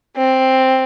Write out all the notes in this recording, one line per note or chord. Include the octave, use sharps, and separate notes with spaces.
C4